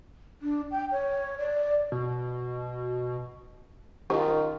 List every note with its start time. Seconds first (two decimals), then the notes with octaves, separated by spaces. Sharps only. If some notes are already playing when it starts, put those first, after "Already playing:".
0.42 D4
0.71 G5
0.92 C#5
1.38 D5
1.92 B2
4.10 D#3 C#4 D#4 F4 G4